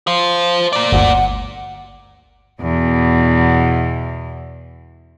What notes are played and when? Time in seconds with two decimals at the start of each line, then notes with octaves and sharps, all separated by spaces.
0.07 C5 F5
0.73 A#3 D5
0.92 G1 D2 F#5
2.62 E2 B2